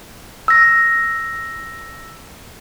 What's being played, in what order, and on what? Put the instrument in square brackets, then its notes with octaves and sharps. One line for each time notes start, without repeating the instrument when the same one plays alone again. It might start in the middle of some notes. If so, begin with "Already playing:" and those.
[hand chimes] E6 A#6